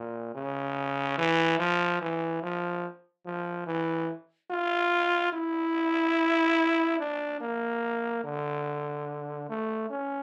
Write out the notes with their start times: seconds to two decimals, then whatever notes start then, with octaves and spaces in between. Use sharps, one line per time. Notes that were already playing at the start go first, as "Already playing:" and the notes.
Already playing: A#2
0.35 C#3
1.18 E3
1.59 F3
2.01 E3
2.43 F3
3.26 F3
3.67 E3
4.51 F4
5.33 E4
7.00 D4
7.41 A#3
8.24 D3
9.49 A3
9.90 C#4